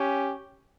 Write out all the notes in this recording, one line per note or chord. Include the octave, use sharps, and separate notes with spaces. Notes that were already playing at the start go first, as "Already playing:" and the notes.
Already playing: C#4 G4